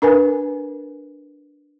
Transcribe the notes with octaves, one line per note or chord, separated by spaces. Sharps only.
D4 A#4 B4 G#5